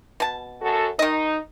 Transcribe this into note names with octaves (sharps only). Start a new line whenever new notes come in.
B2 A5
F#2 F#4 A4
D#3 D#4 D#5